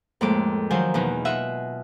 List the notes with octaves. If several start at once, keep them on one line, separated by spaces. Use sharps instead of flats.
F2 A2 G#3 A#3 D6
D#3 F3 F#3 C5 G#5 G6
E2 B2 D#4
F4 D#5 E5 F#5